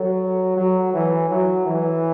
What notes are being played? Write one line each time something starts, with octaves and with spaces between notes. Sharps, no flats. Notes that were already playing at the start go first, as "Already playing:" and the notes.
Already playing: F#3 A4 C#5
F#3
E3
F#3
E3